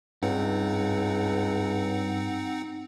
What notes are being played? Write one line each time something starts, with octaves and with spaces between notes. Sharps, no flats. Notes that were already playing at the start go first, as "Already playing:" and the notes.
C#2 G2 C4 D#4 F#5